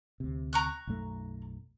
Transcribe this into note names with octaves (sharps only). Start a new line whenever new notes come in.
D2 C3
A#5 C#6 F#6
B1 F#2 A3